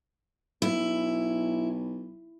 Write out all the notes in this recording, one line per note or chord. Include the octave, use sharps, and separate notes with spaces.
B1 E4